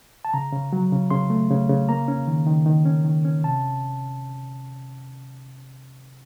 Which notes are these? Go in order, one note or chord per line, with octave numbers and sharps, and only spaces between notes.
A5
C#3 A#5
C#3
F#3
C#3
C#3 C6
A3
C#3
C#3
A#3 A#5
C#4
D#3
D#3
D#3
C#4
D#3
C#4
C3 A5